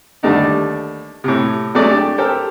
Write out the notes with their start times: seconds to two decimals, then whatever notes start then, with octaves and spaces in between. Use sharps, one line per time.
0.23 D#2 D3 G3 A3 D4 D#4
1.24 A2 C3
1.75 F#3 G#3 A3 C#4 D5
1.90 D4 G4
2.18 G4 A4 A#4 C5